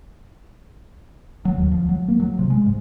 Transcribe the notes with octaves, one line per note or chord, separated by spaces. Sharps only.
F#3
D#2
F3
F#3
A#3
F#3
C3
G#3
G#2